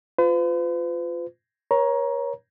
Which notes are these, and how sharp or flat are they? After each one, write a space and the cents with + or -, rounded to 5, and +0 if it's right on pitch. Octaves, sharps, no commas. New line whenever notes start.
F4 +0 B4 +45
A#4 +45 C#5 +0 A#5 +20